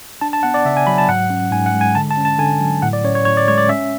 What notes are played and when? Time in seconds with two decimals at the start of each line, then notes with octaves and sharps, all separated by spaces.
0.21 D4 A5
0.33 A5
0.43 B3 F#5
0.54 D5
0.65 C#3 E5
0.77 G#5
0.87 F#3 B5
0.98 A5
1.08 G#2 F#5
1.30 C#4
1.51 G#2 G#5
1.66 F#5
1.73 G#3
1.81 G#5
1.95 D3 A5
2.11 A5
2.17 C#4
2.25 A5
2.38 D3 G#5
2.60 F#3
2.82 A2 F#5
2.93 D5
3.04 C#4 C#5
3.15 C#5
3.25 A2 C#5
3.37 D5
3.48 G#3 C#5
3.58 D5
3.69 C#4 E5